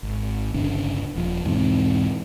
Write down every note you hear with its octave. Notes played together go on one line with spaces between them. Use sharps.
G#1
D1 G1 C#3 D4
D#1 F3
E1 G#2 E3 C4